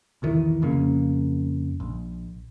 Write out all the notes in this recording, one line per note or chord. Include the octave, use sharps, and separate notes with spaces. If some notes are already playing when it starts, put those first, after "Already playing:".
B1 E2 D#3 E3
F2 C#3 A#3 C#4
A#1